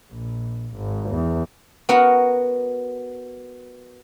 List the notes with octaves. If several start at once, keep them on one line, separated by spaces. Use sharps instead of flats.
A#1
G#1
E2
B3 F#4 A#4 F#5